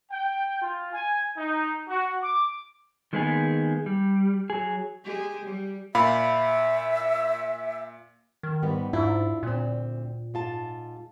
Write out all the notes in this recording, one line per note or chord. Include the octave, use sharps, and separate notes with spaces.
G5
F4
G#5
D#4
F#4
D6
D#3 G#3 A#3 B3 D#4 G#4
G3
F#3 G#4
G#3 G4 G#4
G3
A#2 E5 F5 B5
D#3
G#2 G3 B3
G#2 D4 E4 F4
D2 A#2 C4
G#2 F4 A5